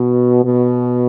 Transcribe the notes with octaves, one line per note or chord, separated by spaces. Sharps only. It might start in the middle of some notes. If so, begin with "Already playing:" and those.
Already playing: B2
B2